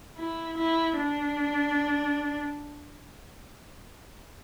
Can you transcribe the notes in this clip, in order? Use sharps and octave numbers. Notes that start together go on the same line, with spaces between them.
E4
E4
D4